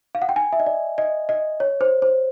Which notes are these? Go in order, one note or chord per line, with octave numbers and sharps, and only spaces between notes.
F5
F#5
G5
G#5
E5
D#5
D5
D#5
D#5
C#5
C5
C5